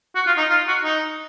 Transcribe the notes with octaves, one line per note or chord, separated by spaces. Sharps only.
F#4
F4
D#4
F4
F#4
D#4